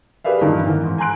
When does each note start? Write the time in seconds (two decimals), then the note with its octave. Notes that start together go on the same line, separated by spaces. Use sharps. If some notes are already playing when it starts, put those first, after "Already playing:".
0.24 G4 G#4 B4 D5 E5 F5
0.41 G2 A#2 D#3 E3 D4 D#4
0.64 D#3 E3 B3
0.84 G#2
0.98 G#5 A#5 C6 F#6 D7